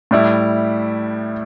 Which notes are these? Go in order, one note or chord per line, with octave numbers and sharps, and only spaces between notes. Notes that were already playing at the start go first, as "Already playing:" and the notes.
A2 G3 E4